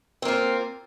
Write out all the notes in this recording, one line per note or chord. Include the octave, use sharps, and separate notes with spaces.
A#3 C4 F4